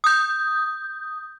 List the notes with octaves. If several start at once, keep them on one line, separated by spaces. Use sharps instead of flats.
D#6 G6